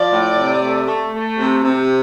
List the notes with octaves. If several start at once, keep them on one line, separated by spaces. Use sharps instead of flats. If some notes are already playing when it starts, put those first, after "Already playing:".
Already playing: F3 D5
A2
C3
A3
A3
A3
C3
C3